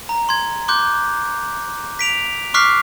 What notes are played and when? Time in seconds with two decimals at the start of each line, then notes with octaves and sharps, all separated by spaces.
0.09 A#5
0.29 C6 G#6
0.68 C6 D6 F#6 G6
1.99 B6 D7 F7
2.54 C#6 D6 F6 F#6 B6 C7